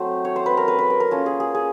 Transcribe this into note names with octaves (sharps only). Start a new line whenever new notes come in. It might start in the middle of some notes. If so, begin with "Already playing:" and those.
Already playing: F#3 A3 C4 C5
C#5
C5
B4
A#4
B4
B4
A#4
A#4
A#3 C#4 F4 A4
G#4
G#4
G#4